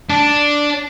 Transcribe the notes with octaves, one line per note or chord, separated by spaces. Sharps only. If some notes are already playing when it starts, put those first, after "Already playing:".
D4